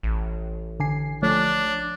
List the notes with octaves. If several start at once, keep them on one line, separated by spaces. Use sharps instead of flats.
A1
D3 G#5 C7
F3 A3 D4 C#5